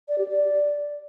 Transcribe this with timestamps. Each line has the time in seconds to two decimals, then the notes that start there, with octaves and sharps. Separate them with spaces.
0.08 D5
0.18 G4
0.28 D5